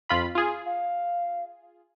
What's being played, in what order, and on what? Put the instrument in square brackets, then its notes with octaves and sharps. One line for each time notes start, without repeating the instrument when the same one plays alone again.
[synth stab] F2 F4 B5
F4 G#4
[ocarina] F5